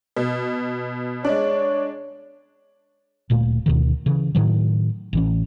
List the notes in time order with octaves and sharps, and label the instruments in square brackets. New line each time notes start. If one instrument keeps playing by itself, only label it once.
[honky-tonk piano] B2
[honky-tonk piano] G#3 D4 [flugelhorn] C#5
[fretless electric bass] D1 A#2 A3
D2 B2 D#3
C#3 E3
A2 D#3 F#3
A1 E3 C#4